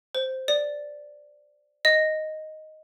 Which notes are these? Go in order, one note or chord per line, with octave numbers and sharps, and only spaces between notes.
C5
D5
D#5